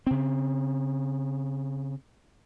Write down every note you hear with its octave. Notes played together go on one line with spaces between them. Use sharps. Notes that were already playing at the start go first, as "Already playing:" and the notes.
C#3 C4